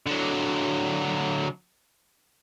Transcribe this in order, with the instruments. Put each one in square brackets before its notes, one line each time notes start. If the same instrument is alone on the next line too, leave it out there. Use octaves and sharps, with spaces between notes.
[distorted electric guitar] D3 F#3